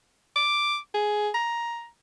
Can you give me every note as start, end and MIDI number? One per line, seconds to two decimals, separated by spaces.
0.36 0.77 86
0.94 1.29 68
1.34 1.87 82